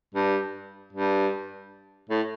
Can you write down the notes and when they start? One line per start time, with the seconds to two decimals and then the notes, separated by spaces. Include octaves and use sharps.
0.14 G2
0.93 G2
2.09 A2